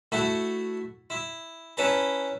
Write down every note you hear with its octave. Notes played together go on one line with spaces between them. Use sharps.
A3 E4 F#4
E4
C#4 E4 B4 A5 A#5